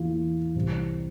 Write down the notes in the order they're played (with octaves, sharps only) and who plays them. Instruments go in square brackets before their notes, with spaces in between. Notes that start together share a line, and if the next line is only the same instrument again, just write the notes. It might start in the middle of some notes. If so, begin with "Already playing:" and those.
Already playing: [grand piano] E2 E3 A#3 F4
C2 C3 E3 G3 C4